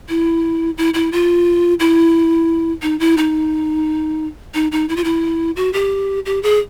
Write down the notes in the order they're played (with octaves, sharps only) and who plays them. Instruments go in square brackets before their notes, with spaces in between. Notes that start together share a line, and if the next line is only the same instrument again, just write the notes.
[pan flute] E4
E4
E4
F4
E4
D#4
E4
D#4
D#4
D#4
E4
F4
E4
F#4
G4
G4
G#4